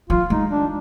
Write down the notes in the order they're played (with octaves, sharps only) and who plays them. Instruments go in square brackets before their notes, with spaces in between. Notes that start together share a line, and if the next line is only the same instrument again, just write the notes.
[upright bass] F3 [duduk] F4
[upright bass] G#3 [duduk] D#4
[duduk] D4